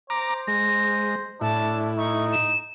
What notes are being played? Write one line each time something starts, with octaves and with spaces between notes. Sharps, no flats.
C5 A#5 D6
G#3 A#6
A2 D4 E4 A5
D#4 C#6
E7